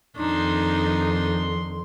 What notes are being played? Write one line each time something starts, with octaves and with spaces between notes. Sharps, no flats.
F2 D#3 D4 D#4 C6